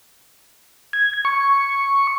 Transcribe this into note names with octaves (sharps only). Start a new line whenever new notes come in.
G#6
C#6